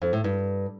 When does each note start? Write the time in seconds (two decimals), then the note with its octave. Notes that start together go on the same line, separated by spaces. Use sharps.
0.02 F2
0.13 A2
0.24 G2